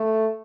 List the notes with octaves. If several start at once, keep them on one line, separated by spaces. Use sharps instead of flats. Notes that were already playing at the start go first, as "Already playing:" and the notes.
Already playing: A3